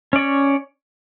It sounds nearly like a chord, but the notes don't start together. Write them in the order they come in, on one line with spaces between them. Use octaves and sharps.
C#4 D5 C#5